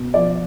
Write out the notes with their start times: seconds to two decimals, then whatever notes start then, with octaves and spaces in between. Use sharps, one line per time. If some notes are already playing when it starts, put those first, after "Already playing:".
Already playing: B2
0.14 F3 D5